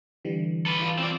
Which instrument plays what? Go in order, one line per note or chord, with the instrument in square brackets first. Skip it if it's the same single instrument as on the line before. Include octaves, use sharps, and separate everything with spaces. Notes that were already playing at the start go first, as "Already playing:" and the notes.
[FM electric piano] D3 E3 G3
[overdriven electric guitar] A4 B4
[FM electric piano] E3 F4
[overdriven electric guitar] C4 D5